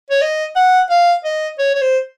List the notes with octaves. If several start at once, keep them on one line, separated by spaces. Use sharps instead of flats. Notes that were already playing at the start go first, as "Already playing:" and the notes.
C#5
D#5
F#5
F5
D#5
C#5
C#5
C5